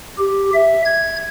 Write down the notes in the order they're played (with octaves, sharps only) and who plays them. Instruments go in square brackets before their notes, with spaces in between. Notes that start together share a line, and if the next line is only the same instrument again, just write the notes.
[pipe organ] G4
E5
G#6